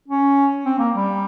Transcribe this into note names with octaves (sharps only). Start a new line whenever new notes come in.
C#4
C4
A#3
G3